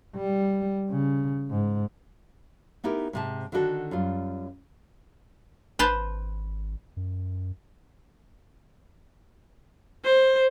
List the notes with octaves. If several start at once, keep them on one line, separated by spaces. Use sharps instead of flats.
G3
C#3
G#2
B3 D#4 E4 G4 A#4
G#2 C3 A5
D3 D#3 D4 E4 F#4 A4
F#2 G3 F4
G#1 B4 C5 A5
F#2
C5